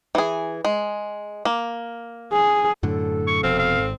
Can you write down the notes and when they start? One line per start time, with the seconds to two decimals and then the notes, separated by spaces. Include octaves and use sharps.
0.15 E3 G#4
0.65 G#3
1.45 A#3
2.33 G#4
2.83 F#2 A2 D3 A4
3.27 C#6
3.43 F1 F2 B2 C4 F5
3.59 F5
3.78 G#1